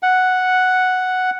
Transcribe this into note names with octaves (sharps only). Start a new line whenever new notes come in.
F#5